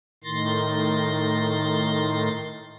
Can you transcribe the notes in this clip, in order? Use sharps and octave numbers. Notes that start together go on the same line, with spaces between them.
A2 D#3 C6 A6 A#6